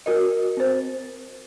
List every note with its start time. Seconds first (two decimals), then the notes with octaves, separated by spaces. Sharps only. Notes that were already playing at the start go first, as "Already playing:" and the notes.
0.06 F#4 A#4 D#5
0.57 C4 C5